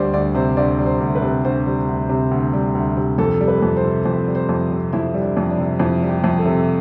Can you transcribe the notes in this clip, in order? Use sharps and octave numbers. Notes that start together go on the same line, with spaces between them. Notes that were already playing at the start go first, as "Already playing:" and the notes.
Already playing: D2 G3 C5 D5
D2 D5
C3 C5
D2 D5
G3
C5
D2
B4
C3
D2 C5
G3
D2
C3
D2
G3
D2
C3
F2 A4
G3
B4
F2
C5
C3
F2 C5
G3
C5
F2
C3
F2 E4
G3
D4
F2
D4
C3
F2 E4
G3
G4
F2
A4
C3